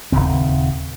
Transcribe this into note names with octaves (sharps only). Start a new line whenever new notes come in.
D#1 B1 C#3 C4